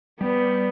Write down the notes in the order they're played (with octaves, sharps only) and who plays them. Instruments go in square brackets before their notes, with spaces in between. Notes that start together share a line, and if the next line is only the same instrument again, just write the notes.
[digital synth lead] G3 [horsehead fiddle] B3